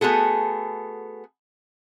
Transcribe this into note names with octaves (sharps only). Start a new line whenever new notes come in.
A3 B3 F#4 G#4 A4